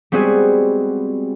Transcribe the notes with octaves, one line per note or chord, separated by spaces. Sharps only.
G3 G#3 B3 C4 F#4 G#4